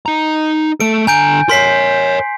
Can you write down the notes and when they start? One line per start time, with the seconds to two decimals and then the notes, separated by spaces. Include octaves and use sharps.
0.06 D#4 A#5
0.80 A3 A4 D7
1.07 D3 G#5 A#5 G6 D7
1.49 A#4 C#5 C6 B6 C7